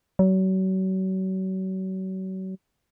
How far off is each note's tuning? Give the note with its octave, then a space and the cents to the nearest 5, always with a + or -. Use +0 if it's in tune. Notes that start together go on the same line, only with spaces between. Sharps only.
F#3 +35